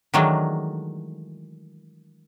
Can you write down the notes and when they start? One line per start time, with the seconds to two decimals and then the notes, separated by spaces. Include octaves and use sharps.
0.14 D#3 E3 F#3 G#3 A3 D4